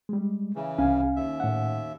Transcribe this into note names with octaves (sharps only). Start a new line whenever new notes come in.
G3 G#3
C#3 E3
C2 C#4 F5 G#5
D#2 E5
A2 F#5